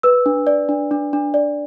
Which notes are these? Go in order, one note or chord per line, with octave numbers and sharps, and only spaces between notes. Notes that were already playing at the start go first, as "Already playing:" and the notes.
B4 E6
D4
D5
D4
D4
D4
D5